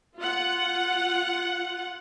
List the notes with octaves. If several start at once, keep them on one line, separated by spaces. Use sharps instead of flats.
F4 F#5